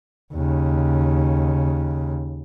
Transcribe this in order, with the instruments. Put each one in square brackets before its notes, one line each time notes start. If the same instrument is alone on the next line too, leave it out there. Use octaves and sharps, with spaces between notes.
[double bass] D#2 C#3